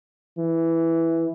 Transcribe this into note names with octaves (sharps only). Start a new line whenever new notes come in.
E3